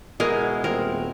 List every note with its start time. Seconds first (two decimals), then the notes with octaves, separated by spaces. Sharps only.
0.20 B2 G#3 E4 A#4
0.64 D#1 C4 A#4